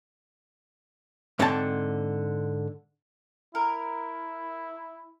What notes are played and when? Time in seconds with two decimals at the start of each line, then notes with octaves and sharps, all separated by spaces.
1.39 G#2 D3 C4 C#5 G5 A5
3.55 E4 A#4